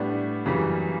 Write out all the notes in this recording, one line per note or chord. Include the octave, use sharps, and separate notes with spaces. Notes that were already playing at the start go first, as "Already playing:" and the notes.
Already playing: A2 G3 B3 D4
F#2 C#3 E3 G3